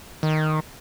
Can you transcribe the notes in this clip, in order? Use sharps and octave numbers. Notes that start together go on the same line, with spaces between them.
D#3